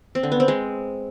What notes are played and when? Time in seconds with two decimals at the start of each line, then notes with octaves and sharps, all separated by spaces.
0.15 C4
0.23 D3
0.32 B3
0.40 C4
0.48 G#3